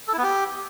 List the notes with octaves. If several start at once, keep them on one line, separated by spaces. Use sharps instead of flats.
A4
E4
B3
G4